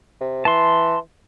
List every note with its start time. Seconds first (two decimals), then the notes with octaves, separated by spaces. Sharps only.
0.21 C3
0.45 E3 A5 C6